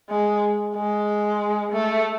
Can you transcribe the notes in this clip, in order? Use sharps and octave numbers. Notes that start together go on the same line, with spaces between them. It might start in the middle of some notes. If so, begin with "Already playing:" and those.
G#3
G#3
A3